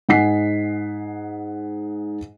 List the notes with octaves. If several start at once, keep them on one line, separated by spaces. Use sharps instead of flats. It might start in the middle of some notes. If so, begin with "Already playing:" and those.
G#2 D#5 F#5 G#5 B6 C7